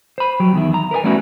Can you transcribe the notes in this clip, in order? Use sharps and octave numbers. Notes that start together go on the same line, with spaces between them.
C5 B5
F#3 G4
E2 D#3 E4
A#5
A#4 B4 D#5 G#5
G3 A3 B3 C#4 E4 F#4